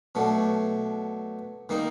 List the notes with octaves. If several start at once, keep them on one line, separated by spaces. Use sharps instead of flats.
B2 F#3 A3 D4
D#3 G3 A#3 D#4